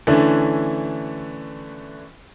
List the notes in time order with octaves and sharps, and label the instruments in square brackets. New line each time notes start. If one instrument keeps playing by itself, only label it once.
[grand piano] D3 E3 A3 C#4 D4 E4